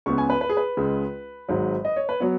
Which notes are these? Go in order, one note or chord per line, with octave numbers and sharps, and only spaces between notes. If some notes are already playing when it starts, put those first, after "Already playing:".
C#2 C#3 B3 C#6
G#5
B4
B4
G#4
B4
C#2 C#3 G#3
G#1 G#2 F#3
D#5
C#5
B4
F#3 B3 C#5